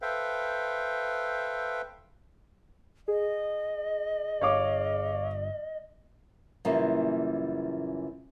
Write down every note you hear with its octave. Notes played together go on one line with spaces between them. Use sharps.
A4 B4 C5 E5 F5 G5
G#4 D#5
G1 C#5 F5 D6
F#2 A#2 C#3 E3 G3 A#3